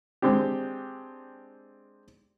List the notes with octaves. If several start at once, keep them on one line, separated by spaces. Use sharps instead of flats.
G#3 C4 D4 G4